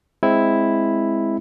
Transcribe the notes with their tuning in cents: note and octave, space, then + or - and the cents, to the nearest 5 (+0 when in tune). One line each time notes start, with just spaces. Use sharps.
G#3 +0 C4 +0 E4 +0